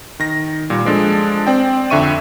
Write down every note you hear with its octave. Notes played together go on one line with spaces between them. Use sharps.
D#3 A#6
A#2 G3
F3 G#3 D4 A4
C4 D5 G5
F2 D3 E5 C#6 D#7